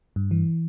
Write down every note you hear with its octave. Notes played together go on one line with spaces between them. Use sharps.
G2
E3